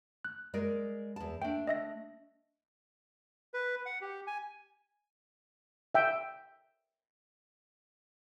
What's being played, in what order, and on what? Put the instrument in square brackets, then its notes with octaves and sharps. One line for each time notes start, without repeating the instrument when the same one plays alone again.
[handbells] F#6
[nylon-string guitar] G#3 A#4 D5
E2 A5
[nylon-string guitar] A3 D4 [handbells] G5
[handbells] D#5 E5 A#6
[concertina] B4
F#5
G4
G#5
[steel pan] E5 G5